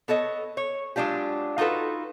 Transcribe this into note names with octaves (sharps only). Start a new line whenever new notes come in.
B3 A4 C#5 D#5
C#5
F#3 G#3 D4 F4 G4
D#4 F4 F#4 A4 B4